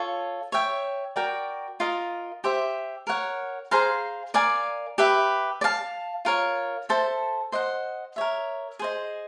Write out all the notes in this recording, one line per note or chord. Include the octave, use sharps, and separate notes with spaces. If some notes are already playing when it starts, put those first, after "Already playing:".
Already playing: F4 A4 C#5
C#5 E5 G5
F#4 A#4 D5 G5
F4 A#4 D#5
G4 C5 E5
A#4 C#5 F#5
G#4 C5 F5 A#5
A#4 D5 F5 G#5
G4 B4 E5
D5
F5 A5
F4 A#4 C#5
A4 C5 E5 A5
C5 D#5 F#5
A#4 C#5 E5
G#4 C5 D#5